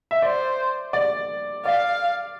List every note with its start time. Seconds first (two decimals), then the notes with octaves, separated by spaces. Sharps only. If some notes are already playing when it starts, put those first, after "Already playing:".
0.11 E5
0.22 C5 D5
0.93 D5
1.65 D5 F5